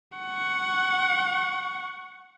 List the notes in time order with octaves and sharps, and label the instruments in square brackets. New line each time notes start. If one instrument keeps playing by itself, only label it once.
[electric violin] F#5 C#6